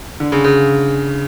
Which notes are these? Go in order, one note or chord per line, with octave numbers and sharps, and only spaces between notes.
D3
C#3
C#3